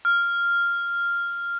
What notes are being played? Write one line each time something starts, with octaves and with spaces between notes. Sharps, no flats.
F6